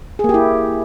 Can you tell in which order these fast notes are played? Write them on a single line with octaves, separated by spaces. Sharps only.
G#4 A#3 G4 E4